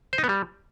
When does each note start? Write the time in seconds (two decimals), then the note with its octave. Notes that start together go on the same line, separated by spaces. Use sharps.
0.13 C5
0.18 D#4
0.24 B3
0.29 G3